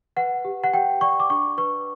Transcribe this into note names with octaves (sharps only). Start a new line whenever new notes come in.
B4 F#5
G4
F#5
G4 G5
D5 C#6
D6
D4 C#6
B4 C#6